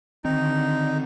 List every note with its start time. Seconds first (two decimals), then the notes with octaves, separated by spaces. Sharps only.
0.25 D3 D#3 C4 D#4